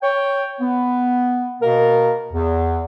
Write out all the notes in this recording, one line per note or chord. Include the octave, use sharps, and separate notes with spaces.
C#5 G5
B3
B2 A#3 A#4
E2